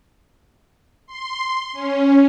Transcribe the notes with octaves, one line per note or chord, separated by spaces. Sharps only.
C6
C#4